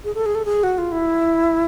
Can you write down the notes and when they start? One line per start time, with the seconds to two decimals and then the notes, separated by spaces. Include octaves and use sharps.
0.04 G#4
0.15 A4
0.26 G#4
0.35 A4
0.45 G#4
0.63 F#4
0.78 F4
0.92 E4